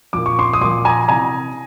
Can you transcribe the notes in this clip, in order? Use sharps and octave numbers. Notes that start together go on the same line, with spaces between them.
A#2 F3 D6
C#6
C6 D6
D#6
A#2 F3 C6 D6
G#5 A#5
C3 E3 G#5 A#5